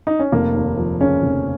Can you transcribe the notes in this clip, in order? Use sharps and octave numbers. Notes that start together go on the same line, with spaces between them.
D#4
C#4
F1 A#3
D#2
F3
C#3 C#4
F1